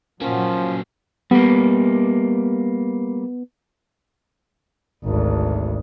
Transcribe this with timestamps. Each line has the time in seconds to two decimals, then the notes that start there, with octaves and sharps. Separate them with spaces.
0.21 A#2 F3 F#3 A#3 C#4 F#4
1.31 G3 A#3 B3
5.04 G#1 D2